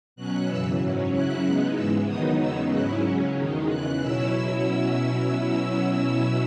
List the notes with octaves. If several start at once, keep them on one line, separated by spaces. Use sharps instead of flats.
B2 F#3 C#4 F#6
F#2 C#3 E3 E6
G#2 F#3 C#4
C#3 F#3 C#4 E4 F#6
C#3 G#3 B3 D#4 F#6
G#2 E3 G#3 E6
D#3 F#3 B3 D#4 D#6
E2 C#3 G#3 B3 D#4 E6
G#2 F#3 C#4 E4 F#6
C#3 F#3 C#4
E2 D#3 G#3 D#4
E2 C#3 E3 F#6
B2 F#3 C#4 E4 E6